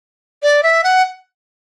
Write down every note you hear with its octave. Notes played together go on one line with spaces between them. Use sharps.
D5
E5
F#5